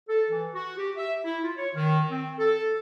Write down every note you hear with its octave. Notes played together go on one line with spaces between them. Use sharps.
A4
E3
F#4
G4
E5
E4
F4
C#5
D#3
C4
A4